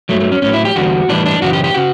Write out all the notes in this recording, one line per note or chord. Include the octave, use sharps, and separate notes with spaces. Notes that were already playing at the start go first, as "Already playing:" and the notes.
G2 F#3 A3
A3
C#4
A2 F#3 C#4
E4
G4
E2 D3 G3 F#4
A2 E3 G3 D4
D4
F#2 C#3 E3 F#4
G4
G4
C#3 F#4